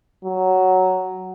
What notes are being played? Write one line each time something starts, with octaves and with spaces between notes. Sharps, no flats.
F#3